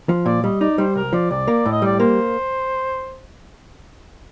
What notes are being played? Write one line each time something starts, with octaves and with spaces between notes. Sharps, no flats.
F3
A#2 D5
G3 D#5
D#4 D5
G3 C5
C2 A#4
F3 D5
C2 D5
A#3
A2
D#5
G3 D5
A#3 C5